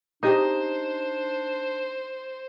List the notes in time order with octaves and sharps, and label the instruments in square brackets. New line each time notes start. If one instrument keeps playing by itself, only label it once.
[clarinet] D4 [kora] D#4 [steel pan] G4 D#5 D#6 [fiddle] C5